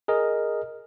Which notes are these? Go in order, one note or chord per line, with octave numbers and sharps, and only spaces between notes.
G#4 A#4 D#5